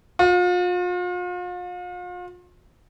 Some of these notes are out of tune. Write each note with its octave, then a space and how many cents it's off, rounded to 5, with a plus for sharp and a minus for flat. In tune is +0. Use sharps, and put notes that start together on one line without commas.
F4 +40